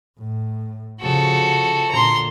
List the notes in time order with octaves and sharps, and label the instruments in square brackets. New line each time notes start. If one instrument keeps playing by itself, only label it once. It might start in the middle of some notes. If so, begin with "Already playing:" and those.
[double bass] A2
[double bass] C#3 F3 [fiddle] F#4 A4
[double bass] A#2 D3 [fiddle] A#5 C6